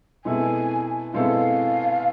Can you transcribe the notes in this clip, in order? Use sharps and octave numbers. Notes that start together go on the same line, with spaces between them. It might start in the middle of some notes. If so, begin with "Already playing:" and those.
B2 G#3 C4 E4 A4 G#5
B2 G#3 C4 E4 A4 F5